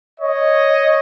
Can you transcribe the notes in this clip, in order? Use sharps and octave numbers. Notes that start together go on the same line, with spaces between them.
C#5 D#5